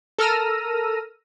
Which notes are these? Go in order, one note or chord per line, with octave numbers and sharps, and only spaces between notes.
A4 A#4 E6 F6 A#6 D#7